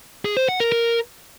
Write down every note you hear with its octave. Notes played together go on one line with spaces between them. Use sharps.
G#4
C5
F#5
A#4
A#4